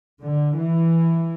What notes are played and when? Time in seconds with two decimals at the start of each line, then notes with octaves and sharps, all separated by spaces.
0.21 D3
0.57 E3